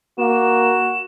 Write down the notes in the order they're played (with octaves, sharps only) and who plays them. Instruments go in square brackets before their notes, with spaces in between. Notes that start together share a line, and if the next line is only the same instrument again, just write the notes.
[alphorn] A#3 [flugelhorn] F#4 [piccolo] E7